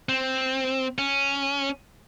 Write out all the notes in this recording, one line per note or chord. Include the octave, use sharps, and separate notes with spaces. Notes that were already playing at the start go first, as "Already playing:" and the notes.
C4
C#4